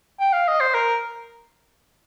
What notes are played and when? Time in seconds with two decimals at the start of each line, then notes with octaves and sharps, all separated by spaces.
0.20 G5
0.33 F5
0.48 D#5
0.60 C5
0.74 A#4